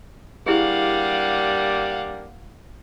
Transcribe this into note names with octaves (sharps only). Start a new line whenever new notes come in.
G3 A#3 D4 E4 G4 G#4 F5 F#5